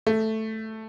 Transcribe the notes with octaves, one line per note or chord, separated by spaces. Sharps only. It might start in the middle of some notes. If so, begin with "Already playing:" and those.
A3